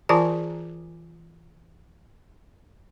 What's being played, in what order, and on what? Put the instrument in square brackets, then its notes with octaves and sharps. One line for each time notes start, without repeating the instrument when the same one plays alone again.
[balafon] E3 F4 A5 [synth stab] G#4 A#4 D5